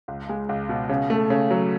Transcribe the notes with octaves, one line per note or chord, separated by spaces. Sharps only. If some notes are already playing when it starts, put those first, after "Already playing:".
C#2
G#3
C#2
B2
C#3
A3
C#3
F#3